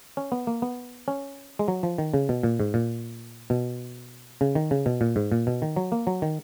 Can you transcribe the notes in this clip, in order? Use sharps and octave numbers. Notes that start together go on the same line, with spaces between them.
C#4
B3
A#3
B3
C#4
G#3
F#3
F3
D#3
C#3
B2
A#2
G#2
A#2
B2
C#3
D#3
C#3
B2
A#2
G#2
A#2
B2
D#3
F#3
A#3
F#3
D#3